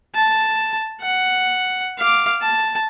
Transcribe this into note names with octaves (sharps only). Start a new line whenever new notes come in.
A5
F#5
F5 D6
A5